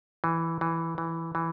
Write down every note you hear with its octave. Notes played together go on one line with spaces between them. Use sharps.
E3
E3
E3
E3